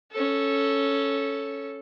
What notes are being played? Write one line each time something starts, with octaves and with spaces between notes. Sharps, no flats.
C#4 A4